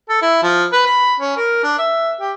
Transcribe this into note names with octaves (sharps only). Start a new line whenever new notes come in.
A4
E4
F3
B4
B5
C#4
A#4
D4
E5
G4